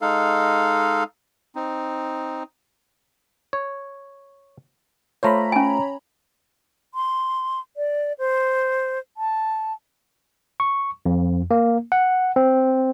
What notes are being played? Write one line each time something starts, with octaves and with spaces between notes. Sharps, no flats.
G#3 D#4 A4 F5
C4 D#4
C#5
A3 F4 C5 C#5 A#5 B5
C#4 G#5
C6
D5
C5
A5
C#6
F2
A#3
F#5
C4